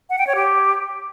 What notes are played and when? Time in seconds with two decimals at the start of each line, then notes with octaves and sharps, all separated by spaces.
0.10 F#5
0.18 G5
0.27 C#5
0.35 G4